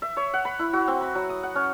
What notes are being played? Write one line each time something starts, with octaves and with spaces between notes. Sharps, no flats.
E5
C#5
F#5
B5
E4
F#4
C4
B5
F#3
D#6
F#5
C#4